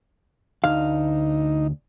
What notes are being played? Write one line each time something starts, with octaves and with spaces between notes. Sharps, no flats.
D2 D#4 F5